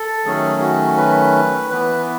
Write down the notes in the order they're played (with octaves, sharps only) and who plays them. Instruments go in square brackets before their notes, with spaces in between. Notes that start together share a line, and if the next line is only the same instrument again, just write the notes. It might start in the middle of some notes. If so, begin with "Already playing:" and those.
Already playing: [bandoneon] A4
D#3 F#3 A3 C#4 G#4
F#4
B4
E3 B3 B4